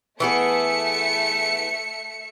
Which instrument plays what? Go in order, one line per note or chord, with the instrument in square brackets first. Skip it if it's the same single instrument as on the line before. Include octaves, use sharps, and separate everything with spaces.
[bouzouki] E3 B3 G#4 [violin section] A3 E5 C#7